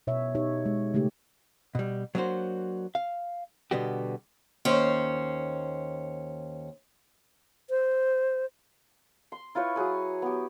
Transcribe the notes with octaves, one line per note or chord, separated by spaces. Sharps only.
B2 C#5 E5
D#4 G4 C#5
G#3
C#3 A3 D#4 G4
B2 G3
F#3 A#3 B3 D4 F#4 C5
F5
B2 D3 G3 B3 F#4 G4
D#2 C#4 C5
C5
C6
E4 F4 B4 C#5
F#3 G#4 B4
B3 G4